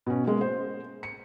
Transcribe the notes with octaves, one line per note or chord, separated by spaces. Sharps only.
B2 C#4
G#3 A#3 C#4
C5
C#7